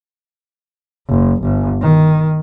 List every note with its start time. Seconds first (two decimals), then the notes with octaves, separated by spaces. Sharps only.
1.09 F#1
1.42 G1
1.81 D#3